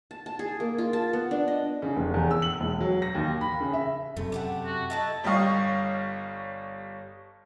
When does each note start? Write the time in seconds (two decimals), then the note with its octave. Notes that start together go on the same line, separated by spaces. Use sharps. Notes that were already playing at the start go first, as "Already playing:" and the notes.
0.11 A5
0.26 A5
0.39 G#4
0.60 A#3
0.78 F4
0.93 A5
1.13 B3
1.31 D4
1.48 D#5
1.82 C#3
1.96 F1
2.14 E2
2.31 E6
2.42 F#7
2.60 E1
2.80 F#3
3.02 A#6
3.15 D#2
3.41 B5
3.60 C#3
3.73 E5
4.17 F#2 C3 A3
4.32 A3 G4 F#5
4.66 F#4
4.90 A3 D#4 E4 A5
5.24 G1 G3 C#5 D#5 F5 C#6